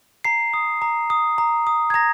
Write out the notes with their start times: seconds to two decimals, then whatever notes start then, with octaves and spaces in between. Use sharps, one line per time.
0.25 A#5 C7
0.54 D#6
0.82 A#5
1.10 D#6
1.38 A#5
1.67 D#6
1.90 G#6
1.94 A#5 A#6